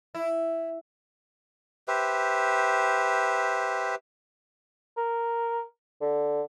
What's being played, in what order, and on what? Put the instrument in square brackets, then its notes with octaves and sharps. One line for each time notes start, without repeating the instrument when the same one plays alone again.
[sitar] E4
[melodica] G4 B4 C5 E5
[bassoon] A#4
D3